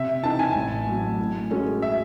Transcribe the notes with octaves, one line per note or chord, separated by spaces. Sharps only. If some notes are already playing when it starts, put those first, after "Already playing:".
Already playing: C3 E5
E3 C4 D#4 A5
G#5
A1
A2 F#3
A2
G#3 C#4 F#4 A4
E5